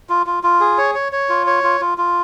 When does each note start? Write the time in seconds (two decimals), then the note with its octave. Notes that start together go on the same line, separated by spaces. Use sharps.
0.09 F4
0.26 F4
0.43 F4
0.60 G#4
0.78 C#5
0.95 C#5
1.12 C#5
1.29 F4
1.47 C#5
1.64 F4
1.80 F4
1.98 F4